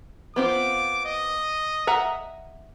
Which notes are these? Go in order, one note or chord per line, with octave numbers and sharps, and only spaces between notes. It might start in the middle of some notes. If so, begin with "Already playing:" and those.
B3 C4 F4 D6
D#5
E5 F#5 A#5